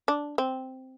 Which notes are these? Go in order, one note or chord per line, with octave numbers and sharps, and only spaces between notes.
D4
C4